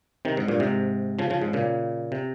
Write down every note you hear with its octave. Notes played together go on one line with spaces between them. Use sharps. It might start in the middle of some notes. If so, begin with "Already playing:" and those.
C3 D#3
G#2
G2 A#2
G#2 C3
C#3 F3
C#3 F3
G#2
A#2 C#3
C3